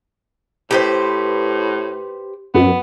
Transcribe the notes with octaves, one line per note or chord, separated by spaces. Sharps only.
A2 G4 B4 C5
F#2 B3